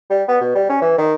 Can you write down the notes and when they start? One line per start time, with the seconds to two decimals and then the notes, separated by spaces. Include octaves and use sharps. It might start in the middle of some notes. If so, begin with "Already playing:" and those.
0.10 G3
0.28 B3
0.41 B2
0.55 G3
0.69 C#4
0.82 E3
0.98 D#3